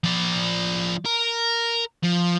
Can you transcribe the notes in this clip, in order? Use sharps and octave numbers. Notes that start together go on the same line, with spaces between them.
F3 D5
A#4
F3